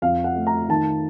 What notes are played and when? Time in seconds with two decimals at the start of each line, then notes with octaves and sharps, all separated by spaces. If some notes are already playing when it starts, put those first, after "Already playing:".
0.02 F2 F5
0.24 F#5
0.36 A3
0.47 A#5
0.69 D#3 A5